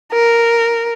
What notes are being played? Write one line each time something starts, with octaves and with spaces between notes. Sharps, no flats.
A#4